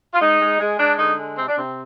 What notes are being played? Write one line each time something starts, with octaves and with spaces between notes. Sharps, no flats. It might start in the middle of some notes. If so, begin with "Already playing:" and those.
F4
G#3 D#4
G#3
G#3
G#3 D4
D3 D#4
G#3
C3 C4
D4
C3 C4